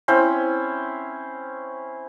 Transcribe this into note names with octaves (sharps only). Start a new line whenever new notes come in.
C4 C#4 E4 C5